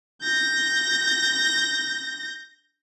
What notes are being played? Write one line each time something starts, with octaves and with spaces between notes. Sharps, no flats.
G6 A#6